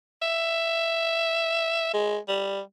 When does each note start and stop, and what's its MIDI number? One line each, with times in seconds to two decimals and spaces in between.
0.22 1.89 76
1.93 2.18 56
2.28 2.60 55